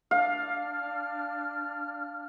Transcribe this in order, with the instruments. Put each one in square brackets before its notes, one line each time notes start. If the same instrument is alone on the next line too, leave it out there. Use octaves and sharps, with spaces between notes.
[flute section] D4 F6 [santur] F5